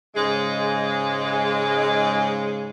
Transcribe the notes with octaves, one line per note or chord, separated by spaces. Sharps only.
G#2 C#3 G#3